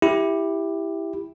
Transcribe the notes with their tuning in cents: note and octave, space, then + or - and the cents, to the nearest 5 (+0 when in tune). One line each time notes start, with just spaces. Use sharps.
E4 +0 G4 +10